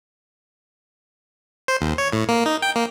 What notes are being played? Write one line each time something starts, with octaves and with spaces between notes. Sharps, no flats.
C5
D#2
C#5
A2
A#3
D#4
G5
A#3